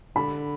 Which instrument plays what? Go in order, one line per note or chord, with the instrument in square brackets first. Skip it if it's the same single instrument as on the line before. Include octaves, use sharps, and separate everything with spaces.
[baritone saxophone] D3 [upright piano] B5